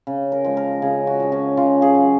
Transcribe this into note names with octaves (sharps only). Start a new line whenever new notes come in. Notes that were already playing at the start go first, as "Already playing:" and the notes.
C#3
A#4
F3 G#3
A#4
C#3 G#4
F#4
F3 G#3
C#4
C#3 F4
G#4
F#3